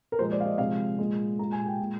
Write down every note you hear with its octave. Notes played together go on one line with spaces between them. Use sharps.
A#4
A#2 F3 G#3 C5
D5
F5
D#5
C3 F3 G#3 F5
A#2 G#3
A#2 G#3 A#5
G#5
G5
A#2 G#3